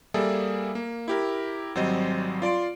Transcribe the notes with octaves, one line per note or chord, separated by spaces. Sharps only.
G3 A#3 G#4 A4 D5 E5
A#3
E4 G4 A#4
G#1 F#3 G3 C4 C5 D#5
F4 D5 C6 D7